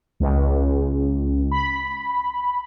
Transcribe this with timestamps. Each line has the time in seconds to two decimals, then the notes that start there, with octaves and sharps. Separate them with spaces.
0.20 C#2
1.51 B5